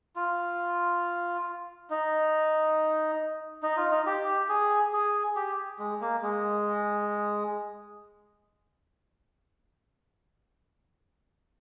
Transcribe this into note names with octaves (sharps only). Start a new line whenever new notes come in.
F4
D#4
D#4
F4
D#4
G4
G#4
G#4
G4
G#3
A#3
G#3